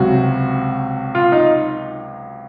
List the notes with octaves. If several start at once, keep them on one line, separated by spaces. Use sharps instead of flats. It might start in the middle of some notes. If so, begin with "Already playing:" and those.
Already playing: C#2 C3 F#3 F#4
F4
D#4